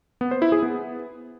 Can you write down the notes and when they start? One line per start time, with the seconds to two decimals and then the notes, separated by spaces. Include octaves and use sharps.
0.21 B3
0.31 C5
0.42 E4
0.52 G#4
0.62 B3